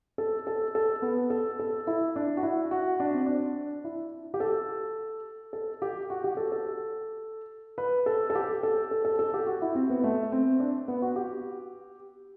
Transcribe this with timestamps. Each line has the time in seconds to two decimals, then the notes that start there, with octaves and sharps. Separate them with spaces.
0.18 A4
0.47 A4
0.75 A4
1.02 B3
1.30 A4
1.60 A4
1.87 E4
2.16 D4
2.37 F#4
2.43 E4
2.71 F#4
3.00 D4
3.14 C4
3.26 D4
3.84 E4
4.34 G4
4.40 A4
5.53 A4
5.82 G4
6.10 F#4
6.24 G4
6.37 A4
6.52 A4
7.78 B4
8.06 A4
8.30 A4
8.35 G4
8.63 A4
8.91 A4
9.05 A4
9.19 A4
9.34 G4
9.47 F#4
9.62 E4
9.75 C4
9.90 B3
10.04 A3
10.32 C4
10.60 D4
10.88 B3
11.02 F#4
11.16 G4